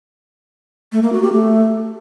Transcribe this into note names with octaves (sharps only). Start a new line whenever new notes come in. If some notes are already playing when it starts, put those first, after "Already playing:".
A3
A#3
F#4
G4
A3